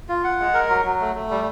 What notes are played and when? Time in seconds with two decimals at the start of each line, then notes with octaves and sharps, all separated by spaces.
0.09 F4
0.24 F#5
0.40 G#3
0.54 A#4
0.69 F#3
0.85 F#3
1.00 A3
1.15 A3
1.30 G3